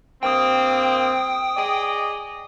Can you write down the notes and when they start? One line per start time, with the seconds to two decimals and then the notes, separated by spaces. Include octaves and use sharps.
0.23 G2 A#3 C4 G5 D#6
1.56 G#4 D5 D#5